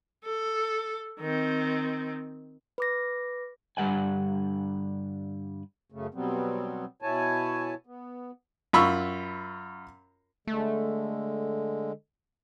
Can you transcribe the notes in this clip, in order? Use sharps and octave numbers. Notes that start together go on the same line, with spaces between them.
A4
D#3 C4
B4 D6 A#6
G2 D3 G3 F#5 G#5
F#2 C#3 A3
B2 F#3 G3 B3 C4
B2 E4 C#5 G#5 A5
B3
F#2 F4 B5 C#6 E6
D3 G#3 A3